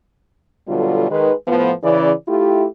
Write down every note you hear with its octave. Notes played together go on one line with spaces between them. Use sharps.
B2 D3 F#3 G3 F4 A4
D#3 G#3 B4
A2 F3 B3
C#3 E3 D5
A3 E4 F4 G4